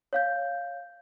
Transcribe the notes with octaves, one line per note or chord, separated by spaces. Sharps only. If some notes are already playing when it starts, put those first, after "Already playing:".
C#5 F5 G6